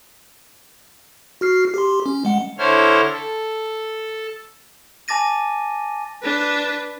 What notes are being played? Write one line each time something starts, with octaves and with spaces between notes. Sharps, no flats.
F#4 F6 C7
G4 C6
C#4
G#3 F#5
D3 E4 A4 C5 C#5 F6
A4
G#5 A5 D6 A6 A#6 D#7
D4 B4